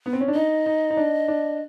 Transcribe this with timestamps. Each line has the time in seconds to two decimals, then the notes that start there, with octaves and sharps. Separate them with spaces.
0.06 B3
0.13 C4
0.21 C#4
0.28 D4
0.34 D#4 D#5
0.66 D#4
0.90 D#4
0.97 D4
1.28 D4